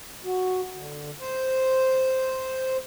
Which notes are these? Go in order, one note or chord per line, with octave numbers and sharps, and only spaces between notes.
F#4
D3
C5